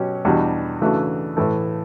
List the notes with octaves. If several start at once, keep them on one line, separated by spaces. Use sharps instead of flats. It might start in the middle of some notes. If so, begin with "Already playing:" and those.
Already playing: B2 F#3 C#4 G4
E2 B2 G3 D4 F#4
C#3 E3 A3 D4 F#4
A2 E3 A3